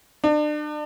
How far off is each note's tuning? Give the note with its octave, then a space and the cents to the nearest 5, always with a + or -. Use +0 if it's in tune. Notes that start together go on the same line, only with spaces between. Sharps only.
D4 +35